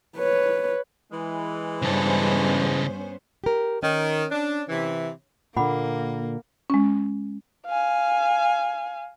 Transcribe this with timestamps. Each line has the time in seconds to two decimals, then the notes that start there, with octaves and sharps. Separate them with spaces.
0.17 B4 C#5
1.12 E3 G#3
1.82 G2 C#3 B3 C#4 A4 C5
3.44 G4 A#4
3.83 D#3 C#4
4.31 D4
4.69 C3 E3
5.56 A#2 D3 A#3 F#5 B5 D6
6.70 G#3 C#4
7.66 F5 G#5